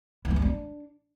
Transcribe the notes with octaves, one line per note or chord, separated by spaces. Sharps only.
E3
A3
A#3
D4